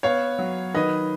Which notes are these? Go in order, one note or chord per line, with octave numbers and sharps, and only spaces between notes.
B3 C#5 F5
F#3
D#3 B4 D#5